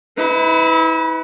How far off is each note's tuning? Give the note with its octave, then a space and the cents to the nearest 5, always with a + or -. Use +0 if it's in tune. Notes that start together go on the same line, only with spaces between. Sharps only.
E4 -35 B4 +20